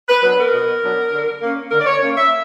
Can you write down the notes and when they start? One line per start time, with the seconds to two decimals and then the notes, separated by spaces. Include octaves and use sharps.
0.08 B4
0.23 F#3 B3 D4 B4
0.38 A#4
0.53 B2
0.83 F#3 B3 D4
1.13 D3
1.42 A#3 C#4
1.72 D3 A#4
1.80 D5
1.86 C#5
2.02 A#3 C#4
2.17 E5